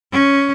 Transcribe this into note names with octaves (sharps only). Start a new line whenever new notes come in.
C#4